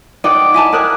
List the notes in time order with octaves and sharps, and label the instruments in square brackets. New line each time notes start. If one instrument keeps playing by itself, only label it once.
[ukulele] D#4 G5 [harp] D5 D#5 F#5
[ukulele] E4 G#5 A5
[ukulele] A#4 C#5 [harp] D5 D#6 F#6